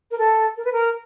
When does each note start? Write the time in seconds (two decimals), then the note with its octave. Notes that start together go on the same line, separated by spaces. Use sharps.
0.11 A#4
0.18 A4
0.57 A#4
0.65 B4
0.73 A#4